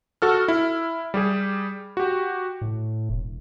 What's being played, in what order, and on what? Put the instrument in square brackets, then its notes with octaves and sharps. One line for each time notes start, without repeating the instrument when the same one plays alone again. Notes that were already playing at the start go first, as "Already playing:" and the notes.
[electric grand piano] F#4 A4 F6
E4
G3 G4 G#4
F#4 G4
[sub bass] A2
E1